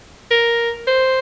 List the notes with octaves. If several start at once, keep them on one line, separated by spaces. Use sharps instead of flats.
A#4
C5